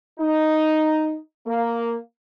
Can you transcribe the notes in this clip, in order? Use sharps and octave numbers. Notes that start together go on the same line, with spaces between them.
D#4
A#3